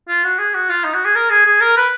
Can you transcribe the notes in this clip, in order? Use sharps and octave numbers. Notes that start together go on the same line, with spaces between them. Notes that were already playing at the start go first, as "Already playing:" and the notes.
F4
F#4
G#4
F#4
F4
D#4
F#4
G#4
A#4
G#4
G#4
A#4
B4